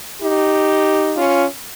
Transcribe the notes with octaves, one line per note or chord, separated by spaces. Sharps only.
D#4 G4
C#4 F4